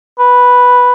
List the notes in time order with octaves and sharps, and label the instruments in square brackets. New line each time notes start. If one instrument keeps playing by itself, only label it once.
[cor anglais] B4